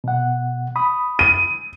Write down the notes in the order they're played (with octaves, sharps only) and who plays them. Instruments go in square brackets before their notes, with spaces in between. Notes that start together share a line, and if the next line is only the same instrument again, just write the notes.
[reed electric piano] B2 F#5
B5 D#6
[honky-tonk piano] D#7